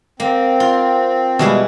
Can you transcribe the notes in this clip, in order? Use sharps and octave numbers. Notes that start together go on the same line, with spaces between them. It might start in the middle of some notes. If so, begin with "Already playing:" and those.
A#3 C4
F4
B2 E3 G3 G#3 E4